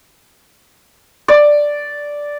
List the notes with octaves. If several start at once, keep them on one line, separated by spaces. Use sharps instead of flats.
D5